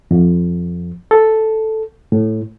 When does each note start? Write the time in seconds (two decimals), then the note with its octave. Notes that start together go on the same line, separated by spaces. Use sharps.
0.11 F2
1.11 A4
2.12 A2